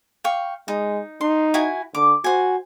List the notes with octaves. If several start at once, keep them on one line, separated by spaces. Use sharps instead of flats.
F5 G5 C#6
G#3 D#4
D#4 C6
E4 F#4 G#5
D3 D6
F#4 C5 G#5